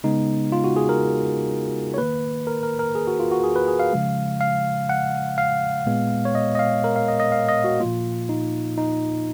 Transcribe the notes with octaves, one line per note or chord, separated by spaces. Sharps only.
C#3 G#3 B3 D#4
F4
F#4
G#4
A#4
C#5
D#3 A#3 B4
A#4
A#4
A#4
G#4
F#4
F4
F#4
G#4
B4
G#4
F5
C#3 F3 G#3
F5
F#5
F5
A#2 G#3 B3
C#5
D#5
D#5
F5
A#4
F5
D#5
D#5
F5
D#5
F#4
A#2 F3 A#3 F4
D#4
D#4